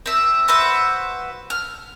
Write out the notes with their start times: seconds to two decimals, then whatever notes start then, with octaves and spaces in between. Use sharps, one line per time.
0.06 C4 E5
0.48 F#4 B4 C5 E5
1.50 F6